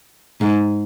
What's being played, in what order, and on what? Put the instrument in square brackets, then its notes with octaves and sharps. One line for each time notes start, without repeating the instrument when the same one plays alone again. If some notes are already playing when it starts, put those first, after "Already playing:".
[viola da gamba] G#2